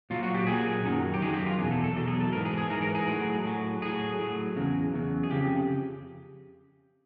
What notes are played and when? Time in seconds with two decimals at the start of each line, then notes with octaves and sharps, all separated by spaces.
0.10 A#2 F#3 F4
0.23 F#4
0.35 G4
0.47 A#2 F#3 G#4
0.84 F#2 D#3 F#3
1.14 G4
1.21 F#2 D#3 F#3 G#4
1.34 G4
1.46 F4
1.58 E2 B2 F#3 G#4
1.71 A4
1.84 A4
1.96 E2 B2 F#3 A4
2.08 G#4
2.20 A4
2.33 G#2 E3 A#4
2.45 G#4
2.58 G#4
2.70 G#2 E3 A#4
2.82 A#4
2.95 G#4
3.07 A2 F#3
3.44 A2 F#3
3.81 A2 F#3 G#4
4.18 A2 F#3
4.56 E2 C#3 F#3
4.93 E2 C#3 F#3
5.23 G#4
5.31 F2 C#3 G4